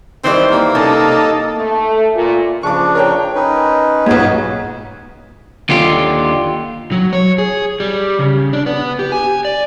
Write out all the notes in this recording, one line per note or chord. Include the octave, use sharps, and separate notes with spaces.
D#3 E3 G3 C4
A#3
C3 C#4 D#4 A4
A3
A#2
C#3 F3 D4 C#6 D6
A#4 C#5 G5
C#4 D#4 B4
B1 G#2 B3 F#4 C#5
D#2 D3 F4 G4
F#3
C#5
G#4
G3
C#3
D4
B3
G4
G#5
D5